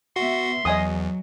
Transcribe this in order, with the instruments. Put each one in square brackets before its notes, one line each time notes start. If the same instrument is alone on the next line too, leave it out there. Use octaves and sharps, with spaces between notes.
[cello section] B3 E5 [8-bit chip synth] F#4 [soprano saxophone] C6
[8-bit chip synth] E2 [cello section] F#3 [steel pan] D#5 G#5 D#6